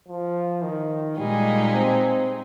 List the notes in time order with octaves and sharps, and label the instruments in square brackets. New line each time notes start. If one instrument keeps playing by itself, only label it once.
[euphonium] F3
D#3
[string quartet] A#2 G#3 D#4 G#4 [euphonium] G3
[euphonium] C4